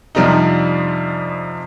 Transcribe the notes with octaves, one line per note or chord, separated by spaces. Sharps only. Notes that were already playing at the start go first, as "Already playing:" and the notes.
F2 C3 F3 G3 D4 D#4